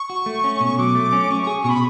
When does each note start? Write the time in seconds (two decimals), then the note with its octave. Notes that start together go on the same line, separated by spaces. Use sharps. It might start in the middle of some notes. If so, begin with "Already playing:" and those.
Already playing: C#6
0.10 F#4
0.26 A3
0.44 C#4
0.61 B2
0.78 F#3 D6
0.95 A3
1.13 C#4
1.30 C#4 C#6
1.43 G#4 C#6
1.64 B2 C#6
1.69 B5